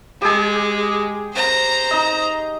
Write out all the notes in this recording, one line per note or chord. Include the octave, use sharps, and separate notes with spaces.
G#3 G4 G#4
C5 A#5
D#4 D#5